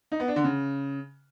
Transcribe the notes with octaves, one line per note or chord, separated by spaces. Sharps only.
D#4
B3
D4
D3
C#3